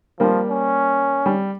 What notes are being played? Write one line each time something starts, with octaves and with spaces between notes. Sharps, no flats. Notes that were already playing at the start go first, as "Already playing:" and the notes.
F3 G3 A#3
C#4
G3